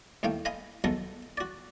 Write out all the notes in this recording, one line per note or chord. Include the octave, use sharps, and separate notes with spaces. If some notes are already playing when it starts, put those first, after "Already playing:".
D#2 A2 A3 F5 G5
D#5 F5 G#5 B5 C6
B1 F#3 G#3 B3 A4 A#4
F#4 D5